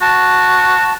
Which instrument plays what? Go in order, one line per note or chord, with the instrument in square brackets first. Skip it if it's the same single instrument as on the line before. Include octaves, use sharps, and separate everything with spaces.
[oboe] F#4 [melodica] A5